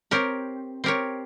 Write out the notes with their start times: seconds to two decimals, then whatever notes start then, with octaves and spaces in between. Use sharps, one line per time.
0.11 C4 G4 A#4 C#5
0.84 C4 G4 A#4 C#5